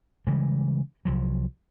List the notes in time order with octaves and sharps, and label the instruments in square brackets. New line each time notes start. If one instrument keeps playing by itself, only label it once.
[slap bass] C#3 E3 G3 G#3
C2 F3 F#3